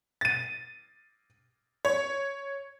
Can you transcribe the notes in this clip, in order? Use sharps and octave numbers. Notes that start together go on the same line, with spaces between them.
A6 D#7
C#5